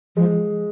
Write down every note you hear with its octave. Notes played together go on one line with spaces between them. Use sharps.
F3 G#3